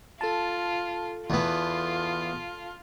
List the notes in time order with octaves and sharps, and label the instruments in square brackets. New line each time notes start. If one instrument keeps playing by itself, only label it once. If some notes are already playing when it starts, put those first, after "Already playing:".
[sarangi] F4 [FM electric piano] A4 A5
[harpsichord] E2 B3 [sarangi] F4